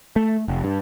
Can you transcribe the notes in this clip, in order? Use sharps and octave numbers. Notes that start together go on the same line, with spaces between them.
A3
F1
G2